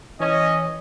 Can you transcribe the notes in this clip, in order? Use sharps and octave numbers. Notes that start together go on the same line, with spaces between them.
E3 C#4 C#5 D#5 G#5